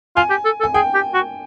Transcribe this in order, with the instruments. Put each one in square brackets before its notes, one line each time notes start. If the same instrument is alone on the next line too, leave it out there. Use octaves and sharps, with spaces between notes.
[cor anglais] F4 [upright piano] G#5
[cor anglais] G4
A4
A4
[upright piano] G#5
[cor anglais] G#4 [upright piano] G5
[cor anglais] G4
F#4